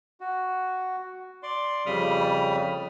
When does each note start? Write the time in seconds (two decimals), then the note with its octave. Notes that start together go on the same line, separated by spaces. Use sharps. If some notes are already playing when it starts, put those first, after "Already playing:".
0.20 F#4
1.43 D5 C6
1.86 F2 C#3 G3 B5 D#6 F6